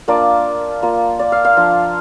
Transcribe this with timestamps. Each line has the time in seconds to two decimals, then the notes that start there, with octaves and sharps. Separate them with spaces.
0.08 A#3 D4 F4 D5
0.82 A#3 F4
1.19 D5
1.32 F5
1.45 F5
1.57 F3 D4 F4